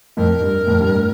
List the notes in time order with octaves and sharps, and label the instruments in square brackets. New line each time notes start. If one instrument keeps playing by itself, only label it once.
[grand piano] F2 A2 [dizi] A#4
[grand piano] G2
F2 A2
G2
A2